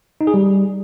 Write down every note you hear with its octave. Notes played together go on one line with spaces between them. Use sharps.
D#4
G#4
G3